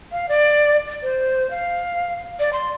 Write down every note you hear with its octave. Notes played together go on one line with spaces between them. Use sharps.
F5
D5
C5
F5
D5
C6